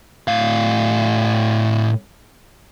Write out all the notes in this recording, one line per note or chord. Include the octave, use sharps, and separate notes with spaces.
A2 F5